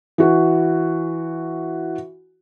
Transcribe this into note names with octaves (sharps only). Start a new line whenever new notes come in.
E3 F#4